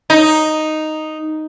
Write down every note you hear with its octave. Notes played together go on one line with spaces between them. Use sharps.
D#4